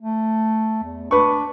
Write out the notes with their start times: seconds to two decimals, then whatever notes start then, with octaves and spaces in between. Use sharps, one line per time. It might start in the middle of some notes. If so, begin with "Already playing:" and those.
0.01 A3
0.84 E2
1.11 D4 B4 C#6